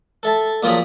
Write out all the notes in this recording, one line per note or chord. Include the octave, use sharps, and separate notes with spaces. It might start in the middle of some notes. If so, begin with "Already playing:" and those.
A4 E5 A5
A#2 F3 F#3 G#4 B5